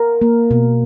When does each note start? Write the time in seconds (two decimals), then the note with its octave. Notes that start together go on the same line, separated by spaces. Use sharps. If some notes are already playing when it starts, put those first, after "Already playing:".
Already playing: A#4
0.22 A#3
0.51 B2